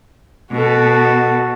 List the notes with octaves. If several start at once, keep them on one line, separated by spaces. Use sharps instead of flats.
B2 F#4 A4